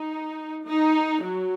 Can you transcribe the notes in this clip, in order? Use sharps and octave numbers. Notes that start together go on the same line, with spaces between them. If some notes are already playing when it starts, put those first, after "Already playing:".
Already playing: D#4
D#4
F#3